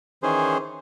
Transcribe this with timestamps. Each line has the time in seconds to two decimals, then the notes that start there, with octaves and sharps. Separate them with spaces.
0.23 D#3 E3 C#4 G#4 C5